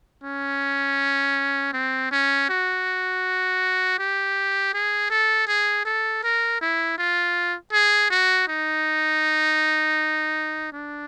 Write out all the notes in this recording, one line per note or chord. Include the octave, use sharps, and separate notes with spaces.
C#4
C4
C#4
F#4
G4
G#4
A4
G#4
A4
A#4
E4
F4
G#4
F#4
D#4
D4